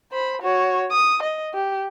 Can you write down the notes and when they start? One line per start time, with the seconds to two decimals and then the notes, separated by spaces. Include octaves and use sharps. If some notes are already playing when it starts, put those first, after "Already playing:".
0.12 C5 B5
0.41 F#4 C#5
0.91 D#6
1.23 D#5
1.54 G4